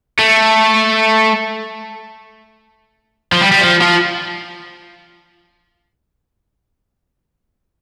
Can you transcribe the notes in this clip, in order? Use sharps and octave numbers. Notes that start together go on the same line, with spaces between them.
A3
F3
G3
G3
F3
F3